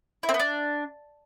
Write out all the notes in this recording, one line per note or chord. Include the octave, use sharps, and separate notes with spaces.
E4
C4
B3
D4